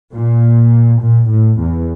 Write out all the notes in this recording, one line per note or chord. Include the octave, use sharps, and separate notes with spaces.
A#2
A#2
A2
E2